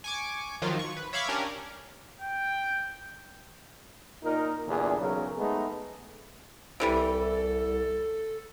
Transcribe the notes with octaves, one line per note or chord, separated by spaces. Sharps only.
G#5 C#6 D6
D#3 F3 F#3 F4
C#6
B4
C#5 E5 F5 B5 C#6 D6
C#4 D4 G4 A#4
G5
A#2 D#4 A#4
E2 A#2 D3 G3 D4 G#4
B1 C#3 F#3 C#4 F#4 A#4
G#3 A3 B3 D#4 G#4 A4
C2 C3 E3 G3 A4